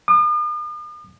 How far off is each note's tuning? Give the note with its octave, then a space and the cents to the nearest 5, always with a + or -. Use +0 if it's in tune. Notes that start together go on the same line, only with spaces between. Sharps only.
D#6 -45